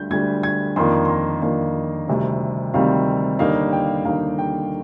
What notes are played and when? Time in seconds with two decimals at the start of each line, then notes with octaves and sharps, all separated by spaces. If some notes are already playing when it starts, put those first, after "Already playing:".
Already playing: D2 D3 G3 G6
0.10 D2 D3 G3 G#6
0.43 G#6
0.76 F2 D#3 A#3 D4 C6
1.05 C6
1.09 A#5
1.42 F2 D#3 A#3 D4
2.08 D2 C3 D#3 G3 C4
2.74 D2 C3 D#3 G3 C4 F5
3.39 D#2 D3 G3 A#3 D#4 F5
3.73 G5
4.05 D#2 D3 G3 A#3 D#4 F5
4.38 G5